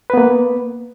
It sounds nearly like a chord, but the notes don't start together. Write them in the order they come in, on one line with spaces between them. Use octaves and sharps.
B4 B3 A#3